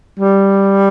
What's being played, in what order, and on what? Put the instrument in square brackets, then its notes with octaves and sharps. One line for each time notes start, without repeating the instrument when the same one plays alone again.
[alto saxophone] G3